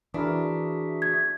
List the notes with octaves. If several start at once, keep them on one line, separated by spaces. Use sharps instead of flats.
E3 D4 E4 F#4 G#4 A#4 E5
G#6